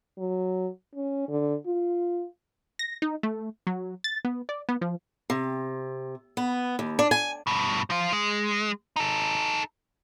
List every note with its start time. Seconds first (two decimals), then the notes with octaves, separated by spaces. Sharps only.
0.18 F#3
0.95 C#4
1.28 D3
1.66 F4
2.79 A#6
3.02 D#4
3.23 A3
3.67 F#3
4.04 A6
4.25 B3
4.49 D5
4.69 B3
4.81 F3
5.30 C3
6.37 B3
6.79 D#2
6.99 D4
7.11 G#5
7.47 G2 B2
7.90 F3 F4
8.13 G#3
8.96 D#4 A4